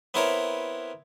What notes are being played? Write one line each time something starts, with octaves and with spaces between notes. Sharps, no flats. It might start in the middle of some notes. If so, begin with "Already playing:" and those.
B3 C4 E4 A#4 C#5